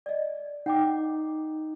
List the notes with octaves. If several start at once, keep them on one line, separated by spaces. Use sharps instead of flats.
D5 D#5
D#4 F#5 G5 D6